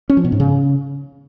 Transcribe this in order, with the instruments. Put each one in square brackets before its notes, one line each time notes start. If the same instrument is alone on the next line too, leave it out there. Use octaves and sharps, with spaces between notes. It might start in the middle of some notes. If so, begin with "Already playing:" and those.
[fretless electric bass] C#4
F3
B2
G#2
C#3